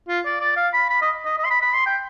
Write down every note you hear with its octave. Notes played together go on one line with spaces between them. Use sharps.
F4
D5
D5
F5
B5
B5
D#5
D#5
D#5
C6
B5
B5
C6
G5